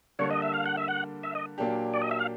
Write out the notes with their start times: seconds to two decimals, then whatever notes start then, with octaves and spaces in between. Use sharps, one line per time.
0.19 D3 G3 A#3 D4 C#5
0.31 D#5
0.42 E5
0.54 F5
0.66 F#5
0.77 E5
0.88 F#5
1.23 E5
1.35 D#5
1.58 A#2 F#3 A#3 D4 G4
1.94 D5
2.02 D#5
2.11 E5
2.19 F5